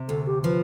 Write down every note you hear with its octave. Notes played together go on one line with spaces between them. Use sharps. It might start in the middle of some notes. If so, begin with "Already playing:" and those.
Already playing: C3
D2 A4
G4
F3 B4